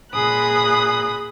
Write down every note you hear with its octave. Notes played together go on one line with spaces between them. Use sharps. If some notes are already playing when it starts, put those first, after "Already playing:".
A#2 G#4 B5 D#6 F#6